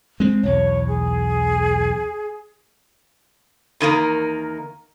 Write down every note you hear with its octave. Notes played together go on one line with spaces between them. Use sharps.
G#3 C4
B1 E2 C#5
G#4
E2 D#3 A#3 A#4